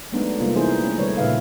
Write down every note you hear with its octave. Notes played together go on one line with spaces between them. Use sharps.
F#3 G#3 A3 B3 D4 D#4
C3 G3 A#3 F4
E3 B3 D#4 E4 G#4 C5
A3 C4 C#4
D3 G3 G#4 B4 C#5
A#2 C#3 D#4 B4 E5 F5